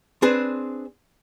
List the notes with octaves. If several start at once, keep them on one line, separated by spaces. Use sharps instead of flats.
C4 D4 G#4 B4